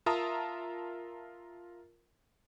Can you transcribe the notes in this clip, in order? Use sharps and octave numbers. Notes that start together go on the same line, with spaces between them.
F4 A#4 E5 A5 A#5 D#6